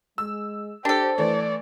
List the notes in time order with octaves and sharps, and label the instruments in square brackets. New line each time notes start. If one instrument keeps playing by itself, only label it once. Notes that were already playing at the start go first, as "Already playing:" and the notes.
[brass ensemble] G#3 [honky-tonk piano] E6
[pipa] D4 A4 [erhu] G4 [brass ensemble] C5
[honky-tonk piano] E3 A3 [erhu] D5